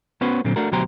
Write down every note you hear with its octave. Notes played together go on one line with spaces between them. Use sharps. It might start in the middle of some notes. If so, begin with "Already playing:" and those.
B3 C#4 F#4 B4 C5
A#2 D3 F#3 C4
A3 D4 F#4 A#4
D2 B2 F#3 G4 C5 A#5